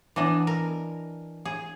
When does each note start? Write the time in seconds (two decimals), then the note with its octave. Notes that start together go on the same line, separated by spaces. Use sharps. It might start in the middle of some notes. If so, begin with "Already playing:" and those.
0.16 E3 B3 D4 D#5
0.47 A#4
1.45 G#4